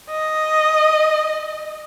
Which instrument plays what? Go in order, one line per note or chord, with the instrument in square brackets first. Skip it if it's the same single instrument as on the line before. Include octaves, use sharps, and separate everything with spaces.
[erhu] D#5